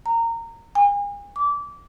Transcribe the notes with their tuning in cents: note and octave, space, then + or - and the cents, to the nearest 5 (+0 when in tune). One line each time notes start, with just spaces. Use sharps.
A#5 -20
G#5 -40
D6 -25